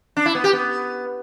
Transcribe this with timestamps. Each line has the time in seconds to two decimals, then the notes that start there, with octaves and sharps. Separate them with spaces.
0.17 D4
0.26 E4
0.35 B3
0.44 G4
0.53 B3